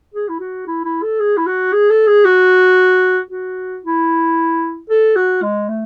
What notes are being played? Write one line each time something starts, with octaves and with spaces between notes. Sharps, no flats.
G#4
E4
F#4
E4
E4
A4
G#4
E4
F#4
G#4
A4
G#4
F#4
F#4
E4
A4
F#4
G#3
A3